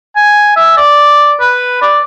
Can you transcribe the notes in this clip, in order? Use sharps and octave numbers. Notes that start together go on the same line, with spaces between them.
G#5
E5
D5
B4
D5